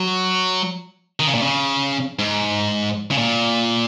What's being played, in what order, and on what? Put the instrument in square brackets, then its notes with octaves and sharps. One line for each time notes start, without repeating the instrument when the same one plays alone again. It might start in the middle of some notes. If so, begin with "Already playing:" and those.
Already playing: [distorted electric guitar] F#3
D#3
C#3
A#2
C#3
G#2
C#3
A#2